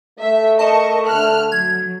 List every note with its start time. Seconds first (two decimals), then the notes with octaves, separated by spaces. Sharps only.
0.19 A3 E5
0.59 A#4 D#5 A5 C#6
1.07 D3 F6 F#6
1.52 F#3 G#6